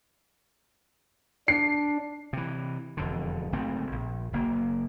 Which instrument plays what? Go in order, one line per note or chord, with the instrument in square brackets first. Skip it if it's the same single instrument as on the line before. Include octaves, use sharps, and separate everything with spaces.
[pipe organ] D4 [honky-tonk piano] C7
[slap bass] C3 E3
E1 F2 D3
F#1 G#2 A3 C4
A#1
F#1 A#3